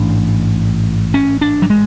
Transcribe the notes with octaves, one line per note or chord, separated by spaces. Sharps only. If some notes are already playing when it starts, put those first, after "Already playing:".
Already playing: A1 G#2 D4
C#4
D4
F#3
G#3